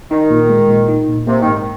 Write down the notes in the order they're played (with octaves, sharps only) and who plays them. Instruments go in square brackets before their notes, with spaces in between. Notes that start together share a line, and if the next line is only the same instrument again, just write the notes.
[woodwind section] D#3 [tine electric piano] D#4
[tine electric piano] A#2
G#3
A#2
D#4
A#2
[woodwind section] C3 [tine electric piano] A#3
[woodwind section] D#3
[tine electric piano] G#2